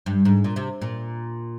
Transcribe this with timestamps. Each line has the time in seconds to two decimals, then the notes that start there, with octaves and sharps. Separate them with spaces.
0.06 G2
0.25 G#2
0.44 A#2
0.56 C3
0.81 A#2